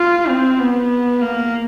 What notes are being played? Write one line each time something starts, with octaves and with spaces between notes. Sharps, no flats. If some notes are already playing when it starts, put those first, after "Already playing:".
Already playing: F4
C4
B3
A#3